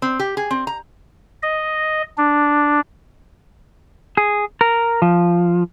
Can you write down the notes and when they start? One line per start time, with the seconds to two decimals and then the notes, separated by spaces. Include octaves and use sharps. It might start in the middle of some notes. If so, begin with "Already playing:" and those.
0.02 C4
0.19 G4
0.37 G#4
0.51 C4
0.67 A#5
1.43 D#5
2.18 D4
4.17 G#4
4.61 A#4
5.02 F3